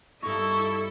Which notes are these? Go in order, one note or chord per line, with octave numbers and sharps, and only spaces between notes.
G2 D#4 E4 A4 C#6